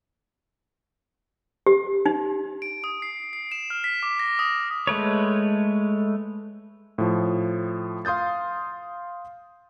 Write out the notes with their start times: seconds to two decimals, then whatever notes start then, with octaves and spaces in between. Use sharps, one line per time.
1.66 G4
2.06 D#4
2.62 D7
2.84 D#6
3.02 C7
3.33 C7
3.52 E7
3.70 F6
3.84 B6
4.03 D6
4.19 A#6
4.39 D#6
4.87 G#3 A3 B4 C#5
6.98 A2 F3
8.05 F5 C6 D#6 G6 A6